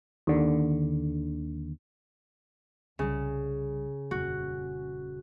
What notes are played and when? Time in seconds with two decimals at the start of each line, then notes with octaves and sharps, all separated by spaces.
0.27 D#2 D3
2.99 C2 C#3 G3
4.11 D#1 F2 F#4